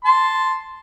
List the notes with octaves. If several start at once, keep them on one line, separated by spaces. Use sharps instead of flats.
A5 C6